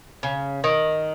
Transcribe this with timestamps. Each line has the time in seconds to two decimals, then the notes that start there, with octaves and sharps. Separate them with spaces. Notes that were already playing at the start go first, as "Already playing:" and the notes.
0.23 C#3
0.64 D#3